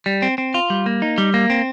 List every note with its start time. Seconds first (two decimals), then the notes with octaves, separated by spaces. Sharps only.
0.06 G3
0.22 C4
0.38 C4
0.54 F4
0.70 G3
0.86 A#3
1.02 D#4
1.18 G3
1.34 A#3
1.50 C4